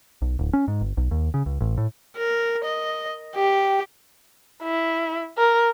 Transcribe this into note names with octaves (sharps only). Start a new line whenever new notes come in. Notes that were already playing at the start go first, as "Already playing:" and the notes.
B1
D1
C#4
G#2
G1
B1
D#2
C#3
C#2
A1
A2
A#4
D#5
G4
E4
A#4